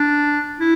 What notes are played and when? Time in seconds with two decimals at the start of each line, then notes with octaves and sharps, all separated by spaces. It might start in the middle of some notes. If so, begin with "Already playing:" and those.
Already playing: D4
0.60 E4